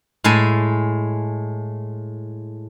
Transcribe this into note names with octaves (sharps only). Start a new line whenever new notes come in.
A2 G#3 A4 G#5